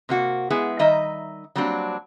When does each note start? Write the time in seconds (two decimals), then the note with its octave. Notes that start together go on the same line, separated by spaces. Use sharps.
0.09 C3 A#3 F#4
0.50 G#3 B3 E4 G#4
0.79 D#3 G3 D#4 D#5 E5
1.56 F#3 G3 A#3 C4 D4